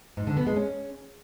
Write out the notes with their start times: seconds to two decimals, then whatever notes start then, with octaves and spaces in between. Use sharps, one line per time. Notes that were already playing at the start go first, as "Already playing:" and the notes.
0.17 G#2
0.27 D3
0.37 B3
0.47 G#3
0.56 C#4